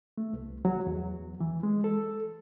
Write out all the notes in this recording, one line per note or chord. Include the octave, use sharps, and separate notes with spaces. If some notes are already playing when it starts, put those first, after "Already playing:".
A3
C2
F#3
E2
E3
G#3
A4